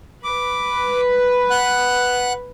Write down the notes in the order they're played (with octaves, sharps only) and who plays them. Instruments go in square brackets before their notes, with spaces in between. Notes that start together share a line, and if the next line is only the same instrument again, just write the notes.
[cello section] B4 [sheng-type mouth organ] D6
[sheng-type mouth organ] F#5 F#6